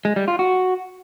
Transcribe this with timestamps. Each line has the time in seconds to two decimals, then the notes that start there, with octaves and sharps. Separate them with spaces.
0.05 G#3
0.16 G3
0.28 F4
0.39 F#4